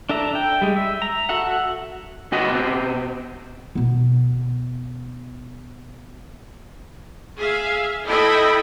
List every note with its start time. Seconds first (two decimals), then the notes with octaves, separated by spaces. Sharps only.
0.09 D4 A4 E5 A#5
0.35 G5
0.61 G3 G#3
0.76 E5
1.02 A#5
1.29 F#4 A4 E5 F#5
2.32 D2 F#4 D#5
2.51 B2 C4
3.75 B2 B3
7.37 G#4 E5 F5
8.06 E4 A4 D#5 E5 G5 B5